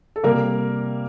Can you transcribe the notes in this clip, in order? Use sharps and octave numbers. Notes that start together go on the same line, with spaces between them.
A4
C3 G3 A#3 A#4